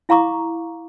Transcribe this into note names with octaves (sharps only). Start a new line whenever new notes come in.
E4 F5 A#5 C#6 D6